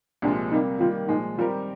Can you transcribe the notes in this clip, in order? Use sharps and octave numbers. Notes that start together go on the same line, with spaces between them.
C2 A#2 F3 G#3 D4
C3 G3 A#3 D#4
D#3 G3 A#3 F4
A#2 F3 G#3 D#4
D#3 G3 C4 F4 G4 A#4